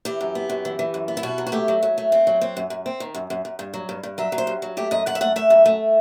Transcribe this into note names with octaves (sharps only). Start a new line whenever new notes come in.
E3 G4
F#2
B3
F#2
E3
E3
F#2
B3
E4
B2 F#4
F#3
F#4
A3 G4
F#3
F#3
A3
C4
F#3
C4
F#2
F#2
C4
D#3
F#2
F#2
F#2
G2
F#3
G2
G2
F#3 E5
F#3
C5
G2
F#3
A3 G4
F#2 D#5
F#2 F#5
E5
A3 F#5
A3 E5
F#2
A3